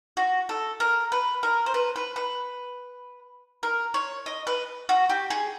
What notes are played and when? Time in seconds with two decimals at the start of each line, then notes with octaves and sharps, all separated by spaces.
0.17 F#4
0.49 A4
0.80 A#4
1.12 B4
1.43 A#4
1.66 C5
1.74 B4
1.96 B4
2.16 B4
3.63 A#4
3.94 C#5
4.26 D#5
4.47 B4
4.89 F#4
5.10 G4
5.30 G#4